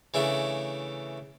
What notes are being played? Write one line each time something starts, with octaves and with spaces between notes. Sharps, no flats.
C#3 E3 A3 D4